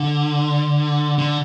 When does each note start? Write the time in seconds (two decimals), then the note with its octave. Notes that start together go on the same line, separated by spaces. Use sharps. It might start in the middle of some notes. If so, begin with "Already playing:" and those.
Already playing: D3
1.18 D3